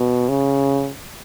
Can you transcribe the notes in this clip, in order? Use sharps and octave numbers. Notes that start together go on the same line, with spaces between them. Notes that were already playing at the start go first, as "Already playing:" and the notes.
Already playing: B2
C#3